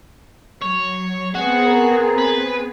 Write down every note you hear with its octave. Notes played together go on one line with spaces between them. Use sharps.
F#3 C#5
B3 C4 F#4 G#4
A#4
B4